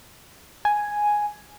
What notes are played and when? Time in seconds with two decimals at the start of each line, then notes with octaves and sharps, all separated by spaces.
0.65 G#5